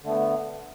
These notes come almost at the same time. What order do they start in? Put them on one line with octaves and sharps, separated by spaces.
D3 A3 B3